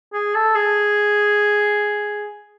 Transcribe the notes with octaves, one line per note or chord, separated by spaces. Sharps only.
G#4
A4
G#4